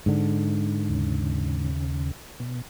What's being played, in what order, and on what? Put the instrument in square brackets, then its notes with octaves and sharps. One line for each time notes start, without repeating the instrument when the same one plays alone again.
[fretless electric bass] G#2 D3
[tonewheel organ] D#2 C#3
B2